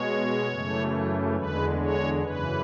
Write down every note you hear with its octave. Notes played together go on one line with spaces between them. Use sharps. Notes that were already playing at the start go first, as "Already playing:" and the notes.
Already playing: B2 G#3 C#5
F#2 C#3 E3 A3
E2 D3 G#3 B4
C#5
F#2 C#3 E3 B4